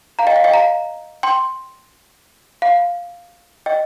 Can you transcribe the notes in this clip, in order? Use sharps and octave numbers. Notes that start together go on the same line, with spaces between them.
F5 A#5
D#5 G5
F5
D#5 G5
F5 A#5
G5 C6
F5
D#5 G5